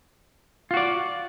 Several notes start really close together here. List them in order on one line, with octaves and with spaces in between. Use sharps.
F4 F#4 D5